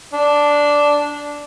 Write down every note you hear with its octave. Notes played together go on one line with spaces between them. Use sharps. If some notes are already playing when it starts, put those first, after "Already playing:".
D4